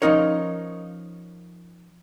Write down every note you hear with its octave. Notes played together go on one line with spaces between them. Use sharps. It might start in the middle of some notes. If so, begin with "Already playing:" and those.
F3 B3 C#4 D#4 A#4 C#5